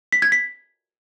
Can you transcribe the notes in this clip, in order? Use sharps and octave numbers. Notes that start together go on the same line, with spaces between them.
B6
G#6
B6